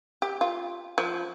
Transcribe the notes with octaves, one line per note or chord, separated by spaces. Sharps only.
G4
F4
F3